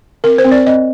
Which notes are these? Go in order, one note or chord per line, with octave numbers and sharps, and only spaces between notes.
C4 A#4
C5
C4
D5
C4 D#5